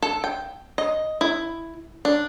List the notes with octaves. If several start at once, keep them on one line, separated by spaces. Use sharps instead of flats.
A4
G5
D#5
E4
D4